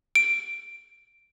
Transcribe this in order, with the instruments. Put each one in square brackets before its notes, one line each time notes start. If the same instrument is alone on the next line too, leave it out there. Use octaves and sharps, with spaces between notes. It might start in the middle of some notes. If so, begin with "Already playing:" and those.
[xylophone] D7